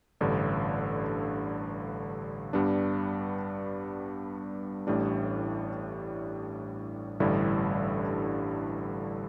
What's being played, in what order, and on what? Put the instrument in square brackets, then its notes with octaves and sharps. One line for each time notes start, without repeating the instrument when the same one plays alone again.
[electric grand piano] A1 G2 D3
G2 G3 B3 D4
A1 A2 G3 D4
A1 G2 D3 G3 E4